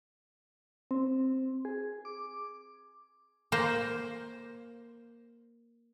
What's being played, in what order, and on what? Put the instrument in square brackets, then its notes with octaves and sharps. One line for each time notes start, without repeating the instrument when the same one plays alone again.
[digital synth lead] C4
G#4
D6
[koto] A#3 C5